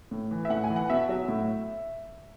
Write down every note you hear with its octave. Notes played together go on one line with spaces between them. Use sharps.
A2
E3
E5
A2 F#5
G#5
E3
F#5
B2 E5
F#3
A2